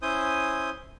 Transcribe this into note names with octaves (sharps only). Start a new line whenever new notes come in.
C#4 E4 C5 G#5 D#6 G6